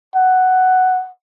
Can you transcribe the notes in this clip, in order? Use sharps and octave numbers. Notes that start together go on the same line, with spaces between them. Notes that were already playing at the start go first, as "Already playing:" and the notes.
F#5